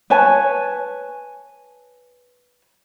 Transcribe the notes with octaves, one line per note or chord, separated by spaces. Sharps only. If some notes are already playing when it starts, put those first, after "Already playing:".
B4 C#5 G#5 A5